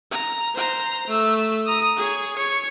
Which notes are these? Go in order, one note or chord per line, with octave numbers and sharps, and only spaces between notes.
A#5
C5 A#5
A3 E6
A#5 D#6
G#4 C#5
C#5 C#7